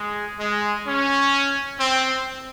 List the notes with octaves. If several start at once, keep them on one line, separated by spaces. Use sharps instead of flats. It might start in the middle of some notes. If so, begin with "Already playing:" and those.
Already playing: G#3
G#3
C#4
C4